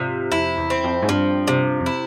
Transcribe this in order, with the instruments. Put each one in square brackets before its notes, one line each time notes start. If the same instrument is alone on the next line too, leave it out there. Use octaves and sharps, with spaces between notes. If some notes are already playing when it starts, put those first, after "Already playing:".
Already playing: [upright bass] G#2 [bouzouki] C3 F3
[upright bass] F2 [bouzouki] E4
[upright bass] E2
[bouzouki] C4
[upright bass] F2
G#2
[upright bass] G2 [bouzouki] F3
[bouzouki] C3
[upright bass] F2
[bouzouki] E4